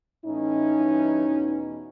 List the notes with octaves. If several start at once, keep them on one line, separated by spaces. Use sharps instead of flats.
A2 E3 C#4 D#4
G2 E3
E2 B2